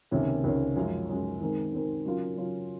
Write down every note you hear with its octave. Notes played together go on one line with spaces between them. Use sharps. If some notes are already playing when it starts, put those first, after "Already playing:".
C#2 C3 D#3 A#3 C#4
C#2 C3 D#3 A#3 C#4
F#2 F3 G#3 C#4
F#2 F3 G#3 C#4
D#3 G#3 C4 D#4 A#4
D#3 G#3 C4 D#4 A#4
C#3 F#3 C#4 F4 A#4
C#3 F#3 C#4 F4 A#4